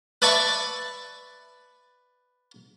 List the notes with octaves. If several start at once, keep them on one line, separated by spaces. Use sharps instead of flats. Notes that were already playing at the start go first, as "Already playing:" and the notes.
B4 D5 E5 A5 B5 C#6